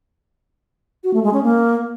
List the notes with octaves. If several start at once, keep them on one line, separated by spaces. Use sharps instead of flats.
F#4
A3
G#3
C#4
A#3